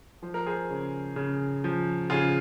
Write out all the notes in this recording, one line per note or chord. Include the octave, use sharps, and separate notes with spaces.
F3 C5
A#4
G#4 C5
C#3
C#3
F3
C#3 F4 G#4